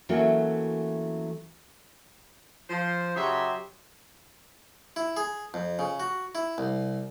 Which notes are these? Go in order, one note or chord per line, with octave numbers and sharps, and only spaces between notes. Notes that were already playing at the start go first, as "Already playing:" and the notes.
E3 F#3 A3 A#3 C#4 F#4
F3 C5
C#3 F#3 G4 D#5 E5 C6
E4
G#4
F2
C#3
F#4
E4
C2